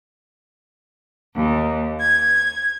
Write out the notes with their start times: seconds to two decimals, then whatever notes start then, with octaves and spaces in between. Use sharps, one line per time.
1.36 D#2
2.00 G#6